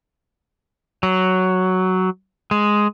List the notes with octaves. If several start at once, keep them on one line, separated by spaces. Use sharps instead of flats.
F#3
G#3